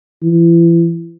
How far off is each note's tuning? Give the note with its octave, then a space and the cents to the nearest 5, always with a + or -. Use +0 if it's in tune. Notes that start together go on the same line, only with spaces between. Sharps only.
E3 +35